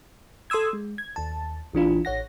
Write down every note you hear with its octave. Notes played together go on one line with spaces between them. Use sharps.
A4 C6 D#6 E6 G#6
G#3
G#6
D#2 A5
A#1 E3 D4 F4
A1 C#5 F#5 A#6